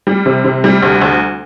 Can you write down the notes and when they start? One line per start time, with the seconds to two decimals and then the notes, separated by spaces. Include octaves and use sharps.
0.07 G3
0.26 C3
0.44 C3
0.64 G3
0.82 D2
1.01 D2